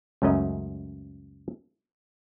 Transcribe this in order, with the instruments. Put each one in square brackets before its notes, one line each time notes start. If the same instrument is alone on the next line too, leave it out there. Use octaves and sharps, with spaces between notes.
[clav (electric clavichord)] C#2 F#2 A3 C#4 D#5 A#5